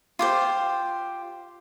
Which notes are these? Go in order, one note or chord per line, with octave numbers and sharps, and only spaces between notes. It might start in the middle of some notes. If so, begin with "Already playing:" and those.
F4 G4 C5